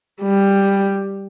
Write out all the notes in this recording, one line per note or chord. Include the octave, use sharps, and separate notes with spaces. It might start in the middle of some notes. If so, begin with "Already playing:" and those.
G3